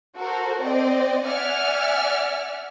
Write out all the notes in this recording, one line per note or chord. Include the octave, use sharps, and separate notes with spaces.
F#4 A4 A#4 C5
C4 D5 D#5
D5 E5 F#5 G#5 F6